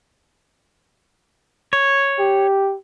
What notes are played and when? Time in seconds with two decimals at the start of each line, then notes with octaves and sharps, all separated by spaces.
1.73 C#5
2.19 G4